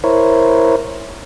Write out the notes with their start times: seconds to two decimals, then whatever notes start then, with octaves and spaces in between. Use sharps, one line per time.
0.04 E4 A#4 C5 C#5